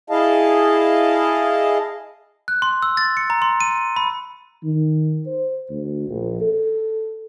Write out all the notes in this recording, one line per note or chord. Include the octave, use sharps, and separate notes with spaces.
E4 G#4 D#5 F5 A5
F#6
C6
E6
A6
C#7
A#5
C6
D#7
B5
D#3
C5
D2
A#1
A4